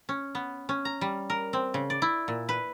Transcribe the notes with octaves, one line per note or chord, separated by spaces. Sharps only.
C#4
B3
C#4
A#5
G3
A#4
C4
C#3
D5
E4
A#2
B4